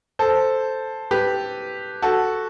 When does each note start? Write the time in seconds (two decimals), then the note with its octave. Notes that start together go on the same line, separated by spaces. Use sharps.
0.19 A4 C5
1.11 G4 B4
2.02 F#4 A4